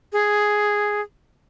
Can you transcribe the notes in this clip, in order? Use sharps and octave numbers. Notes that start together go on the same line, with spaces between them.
G#4